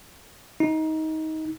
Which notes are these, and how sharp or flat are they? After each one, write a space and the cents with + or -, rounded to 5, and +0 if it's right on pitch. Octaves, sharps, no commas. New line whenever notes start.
D#4 +20